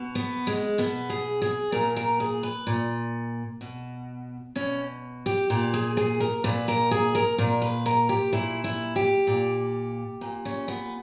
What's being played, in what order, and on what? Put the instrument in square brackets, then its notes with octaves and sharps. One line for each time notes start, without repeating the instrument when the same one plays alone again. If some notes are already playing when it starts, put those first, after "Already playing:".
Already playing: [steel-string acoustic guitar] B2
B3
G#3
B2 B3
G#4
G#4
A#2 A#4
A#4
G#4
B4
A#2
B2
B2 C#4
G4
A#2 G4
G#4
G#4
A#4
A#2 B4
A#4
G#4
A#4
A#2 A#4
B4
A#4
G4
A#2 E4
E4
G4
A#2
A#2
C#4
B3